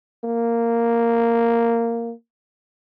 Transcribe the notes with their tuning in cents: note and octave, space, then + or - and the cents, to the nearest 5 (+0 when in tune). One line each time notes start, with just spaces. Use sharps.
A#3 -5